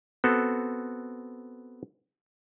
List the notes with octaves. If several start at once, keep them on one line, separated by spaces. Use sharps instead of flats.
B3 C4 F#4 A4